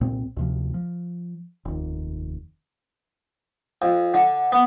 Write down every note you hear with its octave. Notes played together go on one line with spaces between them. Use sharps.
C2 A#2 C4
D2 C3 F3
F3
F1 D#2
F2
D3
B3